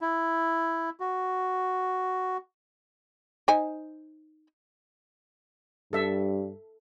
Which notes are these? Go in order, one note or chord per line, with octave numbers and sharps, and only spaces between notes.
E4
F#4
D#4 C5 G#5
G2 A4 E5